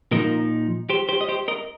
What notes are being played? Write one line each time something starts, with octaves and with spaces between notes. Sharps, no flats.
A#2 F3 D#4 A#4 D#5
G4 C5
G4 C5
D#5
G4 C5
A#4 D#5